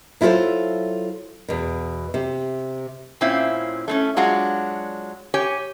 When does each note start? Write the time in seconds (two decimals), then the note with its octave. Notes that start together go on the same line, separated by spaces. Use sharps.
0.21 F#3 E4 F4 G4 A4 C5
1.48 E2 B2
2.14 C3
3.21 A#2 C4 C#4 E4 F4
3.88 A3 C4 C#4
4.16 F#3 G#3 D4 F4 F#4
5.34 G4 C#5 G#5